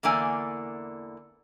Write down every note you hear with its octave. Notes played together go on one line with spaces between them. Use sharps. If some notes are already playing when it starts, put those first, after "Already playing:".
E2 D3 E3 A#3 D5 G#5